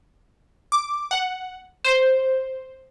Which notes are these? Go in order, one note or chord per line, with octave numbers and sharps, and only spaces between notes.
D6
F#5
C5